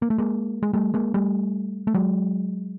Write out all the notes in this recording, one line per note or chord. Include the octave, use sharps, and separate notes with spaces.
A#3
A3
G#3 A#3
G#3
G3 A3
G#3 A#3
G3 A3
A3
F#3 G#3